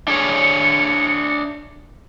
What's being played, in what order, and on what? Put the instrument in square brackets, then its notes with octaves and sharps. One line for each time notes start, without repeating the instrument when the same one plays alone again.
[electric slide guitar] D4 G#4 C#5 [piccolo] C#7